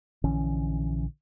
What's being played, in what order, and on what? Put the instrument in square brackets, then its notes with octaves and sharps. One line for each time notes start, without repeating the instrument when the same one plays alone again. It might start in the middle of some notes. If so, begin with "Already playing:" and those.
[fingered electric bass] A#1 D3 E3 C#4